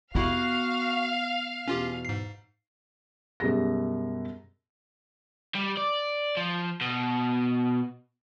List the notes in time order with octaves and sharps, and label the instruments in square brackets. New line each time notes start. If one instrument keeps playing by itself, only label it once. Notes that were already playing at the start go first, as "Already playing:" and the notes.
[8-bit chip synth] F2 C3 E4 [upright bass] B3 [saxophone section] F#4 [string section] F5
[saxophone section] E2 B2 [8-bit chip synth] C#4 F4 G4
[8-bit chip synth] G#2 C7
[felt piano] F#2 B2 G3 G#4 A#6
[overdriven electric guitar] G3
D5
F3
B2